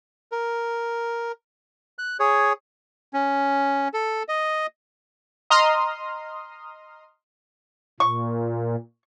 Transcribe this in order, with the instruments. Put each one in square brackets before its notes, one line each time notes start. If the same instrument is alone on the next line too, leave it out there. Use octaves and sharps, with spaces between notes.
[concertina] A#4
F#6
G#4 C#5
C#4
A4
D#5
[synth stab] D#5 A#5 C6 D#6 F6
[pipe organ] A#2 [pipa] C#6